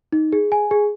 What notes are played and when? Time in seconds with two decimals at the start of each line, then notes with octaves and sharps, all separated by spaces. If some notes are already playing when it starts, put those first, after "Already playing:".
0.12 D#4
0.33 G#4
0.52 G#5
0.71 G#4